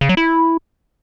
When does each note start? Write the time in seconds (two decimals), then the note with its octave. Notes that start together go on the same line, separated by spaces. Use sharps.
0.01 C#3
0.09 F#3
0.17 E4